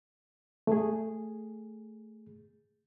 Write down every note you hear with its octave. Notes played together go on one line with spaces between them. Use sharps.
A3 G#4